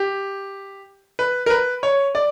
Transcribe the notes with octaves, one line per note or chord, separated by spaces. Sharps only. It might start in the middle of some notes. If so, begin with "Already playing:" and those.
Already playing: G4
B4
A#4
B4
C#5
D5